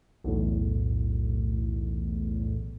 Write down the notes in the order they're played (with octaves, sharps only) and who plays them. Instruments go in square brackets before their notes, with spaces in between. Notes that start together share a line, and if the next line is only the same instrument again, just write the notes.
[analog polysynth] B1 E2 A2